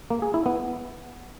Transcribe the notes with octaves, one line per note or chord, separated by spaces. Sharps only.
A#3
G#4
E4
B3